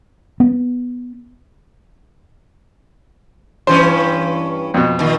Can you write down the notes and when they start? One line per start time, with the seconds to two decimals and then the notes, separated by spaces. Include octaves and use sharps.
0.40 B3
3.67 G2 E3 C#4 C5
4.74 F2 B2
4.99 A#2 D#3